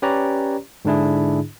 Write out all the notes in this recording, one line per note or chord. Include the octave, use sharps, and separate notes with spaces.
C#4 G4 B4 C#5 D5 A#5
G#2 D3 D4 E4 G#4